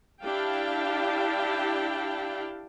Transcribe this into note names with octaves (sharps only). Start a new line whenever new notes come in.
D4 E4 G4 F5 G5 A5